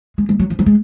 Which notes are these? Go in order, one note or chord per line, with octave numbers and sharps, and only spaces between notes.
G#3
G#3
F#3
F3
F#3
G#3